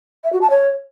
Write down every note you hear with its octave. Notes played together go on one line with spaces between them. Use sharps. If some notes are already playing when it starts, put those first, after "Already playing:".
E5
F#4
A5
C#5